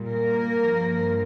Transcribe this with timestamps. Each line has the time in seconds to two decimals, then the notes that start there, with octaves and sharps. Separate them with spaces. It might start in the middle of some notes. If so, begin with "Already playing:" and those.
Already playing: A#2 G3
0.11 A#3 A#4
0.61 G2 F3